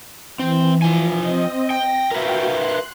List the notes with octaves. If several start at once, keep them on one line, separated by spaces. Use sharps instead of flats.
E3 C4
F3 G#5
C4 D#5
G5 A#6
F#4 A#4 B4 E5 F5 G5
C6 F#6